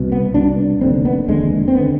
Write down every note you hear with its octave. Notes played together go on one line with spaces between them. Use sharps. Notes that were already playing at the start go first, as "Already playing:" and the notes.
Already playing: C2 B2
B3
C2 B2 D4
F1 D#2 D3 C4
B3
F1 D#2 D3 G#3
C4
B3
D3